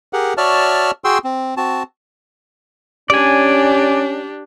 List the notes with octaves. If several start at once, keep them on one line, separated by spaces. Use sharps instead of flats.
G4 G#4 A#4 F#5
F#4 C#5 D5 E5 A5 F6
F#4 G#4 G5 C6 E6
C4
C4 F#4 A5
C#4 D4 G4 D5 G#5